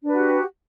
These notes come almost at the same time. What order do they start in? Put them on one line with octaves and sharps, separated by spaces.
D4 B4 F#4 G4